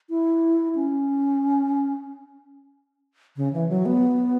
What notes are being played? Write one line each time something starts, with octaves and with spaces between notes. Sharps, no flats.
E4
C#4
C#3
E3
F#3
B3